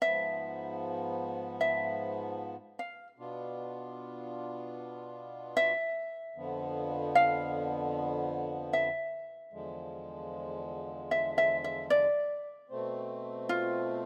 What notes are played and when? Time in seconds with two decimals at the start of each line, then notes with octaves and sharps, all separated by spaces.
0.02 G#2 F3 B3 E5
1.61 E5
2.79 F5
3.19 B2 B3 D4 F4
5.57 E5
6.36 F2 D3 F3 B3
7.15 F5
8.73 E5
9.53 E2 D3 F3 G#3
11.11 E5
11.38 E5
11.64 E5
11.90 D5
12.69 B2 A3 C4
13.49 F4